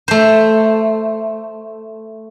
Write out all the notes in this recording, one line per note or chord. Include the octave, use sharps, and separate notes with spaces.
A3 C5